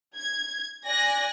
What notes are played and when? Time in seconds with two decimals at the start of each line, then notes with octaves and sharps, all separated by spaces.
0.17 G#6
0.87 D5 G#5 F#6 A#6